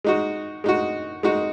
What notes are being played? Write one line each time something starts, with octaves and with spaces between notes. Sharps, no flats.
G#3 D#4 F#4
G#3 D#4 F#4
G#3 D#4 F#4